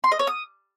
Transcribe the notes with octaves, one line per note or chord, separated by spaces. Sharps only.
C6
D#5
C#5
D#6